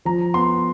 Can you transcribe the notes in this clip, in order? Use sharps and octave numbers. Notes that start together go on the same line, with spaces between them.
F3 A#5
B3 C6